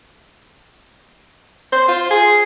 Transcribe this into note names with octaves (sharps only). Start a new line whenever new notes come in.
C5
F4
G#4